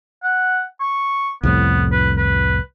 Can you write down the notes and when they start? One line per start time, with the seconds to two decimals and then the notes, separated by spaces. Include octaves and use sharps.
0.23 F#5
0.81 C#6
1.43 C2 F2 A2 B3
1.92 B4
2.18 B4